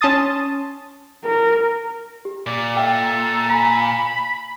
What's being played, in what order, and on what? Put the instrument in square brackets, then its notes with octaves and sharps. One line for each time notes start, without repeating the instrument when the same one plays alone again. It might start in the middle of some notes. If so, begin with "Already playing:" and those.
[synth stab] C#4 A5 C6 D#6 A6
[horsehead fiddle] A#4
[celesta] G4
[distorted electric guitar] A#2 [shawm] D5
[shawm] A4 [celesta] E5 G5
[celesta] G#5 A#5 [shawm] B5